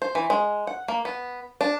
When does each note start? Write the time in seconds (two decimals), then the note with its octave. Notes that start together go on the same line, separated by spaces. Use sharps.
0.02 C5
0.15 E3
0.30 G#3
0.67 F#5
0.88 A#3
1.05 B3
1.61 D4